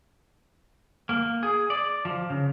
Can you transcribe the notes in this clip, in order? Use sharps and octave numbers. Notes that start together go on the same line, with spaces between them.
A#3
G#4
D5
F3
C#3